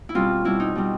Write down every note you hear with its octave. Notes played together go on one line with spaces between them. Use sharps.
E4
B2 G3 C4 F4
B2 G3 C4 E4
D#4
B2 G3 C4